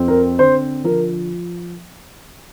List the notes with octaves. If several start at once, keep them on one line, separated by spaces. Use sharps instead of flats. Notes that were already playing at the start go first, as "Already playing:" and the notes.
Already playing: F2 C4
A#4
D3 C5
F3 A#4